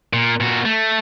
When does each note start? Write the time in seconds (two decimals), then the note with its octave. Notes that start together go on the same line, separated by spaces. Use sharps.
0.13 A#2
0.40 A#2 F#4
0.65 A3